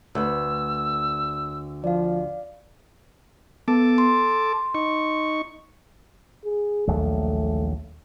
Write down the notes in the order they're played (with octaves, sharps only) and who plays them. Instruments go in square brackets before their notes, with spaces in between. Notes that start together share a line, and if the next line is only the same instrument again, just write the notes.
[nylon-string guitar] D2 B4 [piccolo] E6
[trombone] F3 [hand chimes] D5 F5
[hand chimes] B3 [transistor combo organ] A4 A5 D6
[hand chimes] C6
[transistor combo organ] D#4 C#6
[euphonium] G#4
[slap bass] A#1 D#2 F#3 [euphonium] A3